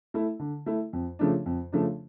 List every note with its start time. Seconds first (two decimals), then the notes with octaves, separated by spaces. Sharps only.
0.14 A3 E4
0.39 D3
0.66 A3 E4
0.93 F2
1.19 C#3 F3 A3 D4
1.46 F2
1.72 C#3 F3 A3 D4